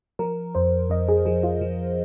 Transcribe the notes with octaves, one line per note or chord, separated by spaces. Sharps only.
F3 A#4
F2 C5
F2 D#5
G#4
F3 G#4
F4
F3